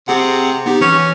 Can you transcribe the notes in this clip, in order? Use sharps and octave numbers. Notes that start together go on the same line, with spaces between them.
C3 C4 G#4 F#5
B3 D#4 G4
E3 C#4